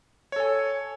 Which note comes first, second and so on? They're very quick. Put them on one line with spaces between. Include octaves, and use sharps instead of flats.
C#5 A4 G#5